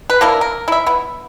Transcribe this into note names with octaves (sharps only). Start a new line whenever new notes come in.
B4
A#3 D4 E4 A#4
A#4
E4 E5
B3 E4